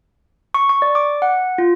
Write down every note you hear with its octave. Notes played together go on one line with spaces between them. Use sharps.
C#6
C#6
D5
D6
F#5
F4